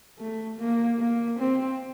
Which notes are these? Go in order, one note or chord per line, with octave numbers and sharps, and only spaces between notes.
A3
A#3
A#3
C4